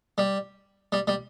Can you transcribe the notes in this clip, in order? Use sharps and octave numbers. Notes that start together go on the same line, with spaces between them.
G3
G3
G3